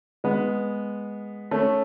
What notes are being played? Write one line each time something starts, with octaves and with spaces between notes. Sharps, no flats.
G#3 B3
A3 C#4